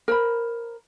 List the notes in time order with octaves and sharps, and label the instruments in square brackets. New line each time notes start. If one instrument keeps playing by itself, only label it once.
[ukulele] A#4 C5 B5